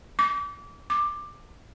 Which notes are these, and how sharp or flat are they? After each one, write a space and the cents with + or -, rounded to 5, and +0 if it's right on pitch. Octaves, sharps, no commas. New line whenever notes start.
D6 -30
D6 +10